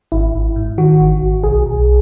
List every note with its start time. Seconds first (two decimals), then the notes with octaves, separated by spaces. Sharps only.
0.12 G#1 E4
0.34 G#1
0.56 G#2
0.78 D#3 F#4
1.00 G#1
1.22 G#1
1.44 B1 G#4
1.65 B1